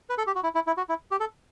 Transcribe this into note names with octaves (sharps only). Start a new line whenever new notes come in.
B4
A4
G4
F#4
E4
E4
E4
F#4
E4
G4
A4